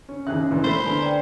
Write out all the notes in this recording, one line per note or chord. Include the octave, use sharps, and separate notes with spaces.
C#4
D#2 C#3 G#4 E5 F#6
A#2 E3
E2 A3 C5 B5 G6 B6
D3 B4 G#5 A#5
D5 G5